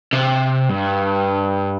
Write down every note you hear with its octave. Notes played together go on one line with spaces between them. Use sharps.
C3
G2